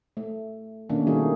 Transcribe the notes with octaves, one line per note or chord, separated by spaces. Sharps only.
A3
B2 D#3 A3 A#3 C#4 D4
D#3 G3 A3 D#4 F#4 G#4